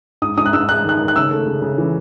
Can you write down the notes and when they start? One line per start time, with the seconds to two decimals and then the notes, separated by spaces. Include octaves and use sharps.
0.22 G#2 D#6
0.37 G#2 D#6
0.46 F#6
0.53 G#2 E6
0.69 G#3 F#6
0.85 D#3 F#6
1.00 D#3
1.08 F#6
1.16 C#3 E6
1.31 A3
1.46 C#3
1.62 C#3
1.78 E3